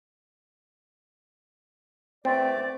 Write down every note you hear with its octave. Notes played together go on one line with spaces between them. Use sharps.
E2 A3 C4 D5